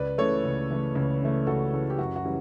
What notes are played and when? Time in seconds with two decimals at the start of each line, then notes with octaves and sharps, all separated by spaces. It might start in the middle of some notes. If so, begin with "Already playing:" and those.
Already playing: C#2 B4 D5
0.18 C#3 E3 A3 A4 C#5
0.44 C#2
0.70 C#3 E3 A3
0.95 C#2
1.21 C#3 E3 A3
1.47 C#2 F#4 A4
1.73 C#3 E3 A3
1.90 G4
1.99 F#2 F#4
2.16 F#4
2.24 C#3 E3 G3